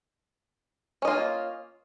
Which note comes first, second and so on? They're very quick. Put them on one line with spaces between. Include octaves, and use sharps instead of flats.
C#4 D#5 F4 A#3